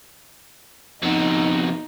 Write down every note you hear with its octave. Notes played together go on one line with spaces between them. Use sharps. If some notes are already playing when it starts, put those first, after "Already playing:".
F2 B2 D#4